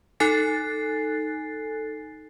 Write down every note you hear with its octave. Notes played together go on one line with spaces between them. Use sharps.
D#4 A4 G#5 F#6 A6 C7